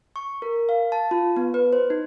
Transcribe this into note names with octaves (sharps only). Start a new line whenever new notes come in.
C#6
A#4
F5
A5
F4
B3
B4
C5
D#4